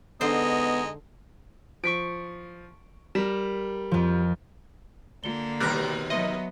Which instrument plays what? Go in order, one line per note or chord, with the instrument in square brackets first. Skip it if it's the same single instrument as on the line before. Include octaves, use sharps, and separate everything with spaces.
[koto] D3 C5 [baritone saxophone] G#3 [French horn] B3 [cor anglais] D#4
[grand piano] F3 [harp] C#6 B6 D7
[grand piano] G3 [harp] A#4 B6 E7
[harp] F2 F3
[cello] D3 A#3 [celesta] F4 G7
[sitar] D#2 B2 A#4 [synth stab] G3 [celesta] F#6 A#6
[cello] F#3 B3 [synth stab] D#5 [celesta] E5 C6